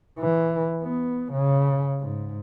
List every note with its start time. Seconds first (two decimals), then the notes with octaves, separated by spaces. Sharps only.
0.19 E3
0.83 B3
1.32 C#3
2.00 G#2